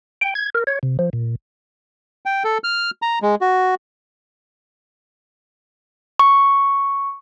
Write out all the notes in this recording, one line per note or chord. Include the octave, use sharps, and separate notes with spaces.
G5
G#6
A#4
C#5
C3
F3
A#2
G5
A4
F6
A#5
G#3
F#4
C#6